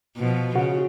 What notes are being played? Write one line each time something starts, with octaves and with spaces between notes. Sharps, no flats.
B2 F3
C#3 F#4